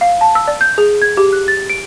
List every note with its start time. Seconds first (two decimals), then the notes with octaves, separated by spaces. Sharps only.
0.01 F5
0.21 A5
0.35 E6
0.48 D5
0.61 G6
0.78 G#4
1.02 G#6
1.17 G4
1.33 F#6
1.48 A6
1.70 D7